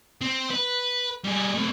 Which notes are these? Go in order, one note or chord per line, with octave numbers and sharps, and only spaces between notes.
C4
B4
G3 G#4
A3 C4